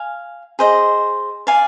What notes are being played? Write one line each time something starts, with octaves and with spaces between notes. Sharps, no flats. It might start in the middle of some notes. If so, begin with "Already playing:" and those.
Already playing: F5 G#5
G#4 C5 D#5
D5 F5 G#5